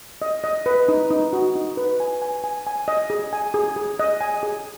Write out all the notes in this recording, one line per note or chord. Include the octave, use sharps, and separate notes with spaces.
D#5
D#5
B4
D#4
D#4
F#4
D#4
B4
G#5
G#5
G#5
G#5
D#5
G#4
G#5
G#4
G#4
D#5
G#5
G#4